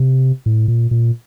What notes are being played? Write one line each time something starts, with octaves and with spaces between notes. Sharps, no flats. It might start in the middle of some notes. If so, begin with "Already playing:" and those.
Already playing: C3
A2
A#2
A#2